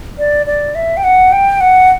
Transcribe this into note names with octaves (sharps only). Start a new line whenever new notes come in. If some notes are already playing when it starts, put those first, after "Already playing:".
D5
D5
E5
G5
F#5
G5
F#5